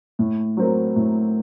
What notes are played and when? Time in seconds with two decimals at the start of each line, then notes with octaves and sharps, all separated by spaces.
0.19 A2
0.57 F#3 C4 F#4 A#4
0.96 A2